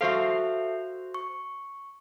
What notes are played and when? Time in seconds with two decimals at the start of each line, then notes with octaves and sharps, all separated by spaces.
0.01 F#4 A4 C5 E5 F5
1.14 C#6